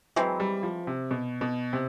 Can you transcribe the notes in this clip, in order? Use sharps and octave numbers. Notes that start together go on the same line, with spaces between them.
E3 F#3 G#3 C4
G3
F3
C3
B2
B2
C3